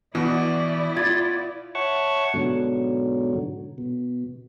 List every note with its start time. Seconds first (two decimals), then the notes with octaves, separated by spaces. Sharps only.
0.15 B2 E3 E4 F#4 D5
0.97 F4 G#6 A6
1.75 C#5 E5 F#5 A5 C#6
2.34 G#2 B2 D3 F#3
3.78 B2